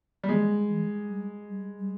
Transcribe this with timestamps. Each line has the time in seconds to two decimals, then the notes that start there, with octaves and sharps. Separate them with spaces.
0.24 G3
0.28 D#3 G#3
0.68 E3
1.09 G3
1.49 G3
1.79 G3